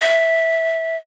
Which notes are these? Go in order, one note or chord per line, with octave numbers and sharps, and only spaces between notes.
E5